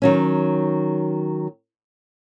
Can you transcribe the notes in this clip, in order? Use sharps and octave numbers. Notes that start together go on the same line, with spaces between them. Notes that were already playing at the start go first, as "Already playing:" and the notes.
D#3 F#3 C#4